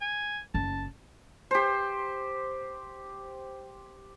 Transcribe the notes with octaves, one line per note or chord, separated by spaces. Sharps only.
G#5
F#1 A5
G4 C5